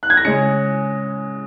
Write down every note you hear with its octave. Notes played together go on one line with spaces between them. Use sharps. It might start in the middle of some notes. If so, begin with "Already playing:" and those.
F#6
G#6
A#6
C#3 G#3 C#7